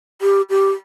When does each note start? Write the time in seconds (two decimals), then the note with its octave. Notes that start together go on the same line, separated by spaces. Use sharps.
0.22 G4
0.50 G4